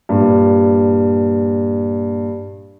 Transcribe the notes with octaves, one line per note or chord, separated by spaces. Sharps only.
G2 A#2